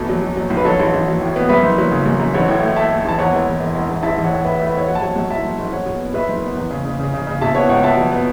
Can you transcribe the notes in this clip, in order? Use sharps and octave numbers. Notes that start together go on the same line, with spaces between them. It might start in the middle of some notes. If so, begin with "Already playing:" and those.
Already playing: E2 B2 A3 A4
F#3
F#3
F#3
B1
B4
F#3 A4 C#5
A1
A1
F#3
A2
B3
F#2 B4 E5
F#1
F#3
C#3
F#2
F#2
A1 C#5 F#5
A2
A3
A3 E5 A5
A3
A1 A5
E2 C#5 F#5
E1
E1
E1
E1
E1
A1 E5 A5
A1
C#5 F#5
A2
A2 B4 E5
B4 E5
A3
B4 E5
A2 C#5 F#5
F#3 F#5
A5
F#3 C#5 F#5
F#2
F#1 E5 A5
F#1
F#1
F#1 C#5 F#5
B2
B3
B2 B4 E5
F#1
B3
E2
C#3
C#3
C#3
C#3
C#3
B2 E5 A5
B3 C#5 F#5
C#2 C#5 F#5
B3 E5 A5
F#3
B3